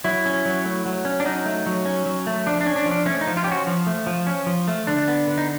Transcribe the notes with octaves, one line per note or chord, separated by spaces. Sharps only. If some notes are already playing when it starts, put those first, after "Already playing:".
F#3 E4
C#4
F#3
A3
F#3
C#4
D4
F#3 D#4
A3
F#3
C#4
F#3
A3
F3 D4
D4
C#4
D4
F3
D4
A3 C#4
D#4
F3
F4
G4
C#4 F#4
F3
A3
F3
C#4
F3
A3
D3 D4
B3
D3
D#4